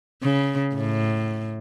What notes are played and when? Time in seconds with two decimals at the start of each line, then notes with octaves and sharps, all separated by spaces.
0.22 C#3
0.75 A2